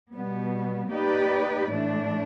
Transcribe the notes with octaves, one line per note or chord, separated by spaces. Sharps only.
B2 G3 B3
A#3 D#4 G4 B4 D5
A2 E3 A3 D4